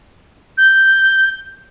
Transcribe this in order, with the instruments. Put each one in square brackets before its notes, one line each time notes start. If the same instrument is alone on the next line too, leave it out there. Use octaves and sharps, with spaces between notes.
[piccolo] G6